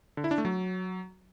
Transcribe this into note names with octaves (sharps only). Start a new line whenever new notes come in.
D3
E4
D4
A3
F#3